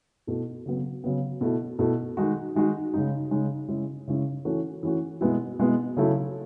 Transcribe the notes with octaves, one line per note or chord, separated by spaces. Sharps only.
B2 A3 E4
C#3 F#3 B3
C#3 F#3 B3
B2 A3 E4
B2 A3 E4
D#3 G#3 D#4 F#4
D#3 G#3 D#4 F#4
C#3 G#3 D#4
C#3 G#3 D#4
C#3 G#3 C#4 E4
C#3 G#3 C#4 E4
E3 A3 C#4 F#4
E3 A3 C#4 F#4
B2 G#3 B3 E4
B2 G#3 B3 E4
C#3 F#3 A3 E4